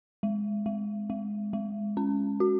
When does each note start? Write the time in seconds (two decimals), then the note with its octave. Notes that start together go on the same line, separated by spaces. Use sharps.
0.23 G#3
0.66 G#3
1.10 G#3
1.53 G#3
1.97 C#4
2.40 F#4